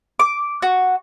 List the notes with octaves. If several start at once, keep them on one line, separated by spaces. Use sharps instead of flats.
D6
F#4